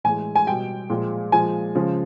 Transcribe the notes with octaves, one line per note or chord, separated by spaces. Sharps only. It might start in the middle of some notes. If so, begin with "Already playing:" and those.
A2 E3 G#3 G#5
G#5
B2 G3 G5
A#2 F3 G#3
A#2 F3 G#3 G#5
C#3 F3 G#3